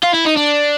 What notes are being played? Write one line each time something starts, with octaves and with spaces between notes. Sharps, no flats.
F4
E4
D#4
D4